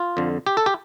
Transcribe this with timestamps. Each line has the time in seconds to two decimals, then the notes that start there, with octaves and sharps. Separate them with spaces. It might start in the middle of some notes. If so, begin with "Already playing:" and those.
Already playing: F4
0.17 F2 D3
0.47 G4
0.57 A4
0.66 G4